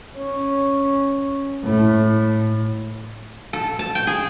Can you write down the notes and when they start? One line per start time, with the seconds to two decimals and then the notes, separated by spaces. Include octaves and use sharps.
0.17 C#4
1.64 A2
3.53 A4
3.79 A5
3.95 G5
4.07 G#4